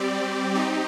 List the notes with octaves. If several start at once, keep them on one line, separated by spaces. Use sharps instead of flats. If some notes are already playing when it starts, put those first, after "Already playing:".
Already playing: G3 C4 G4 D5
C4 D#4 G4